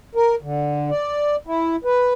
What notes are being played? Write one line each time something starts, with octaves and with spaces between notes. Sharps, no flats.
A#4
D3
D5
E4
B4